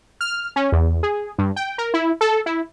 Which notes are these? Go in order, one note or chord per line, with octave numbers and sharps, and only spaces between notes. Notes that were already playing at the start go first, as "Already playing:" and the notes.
F6
C#4
E2
G#4
G2
G5
A#4
E4
A4
E4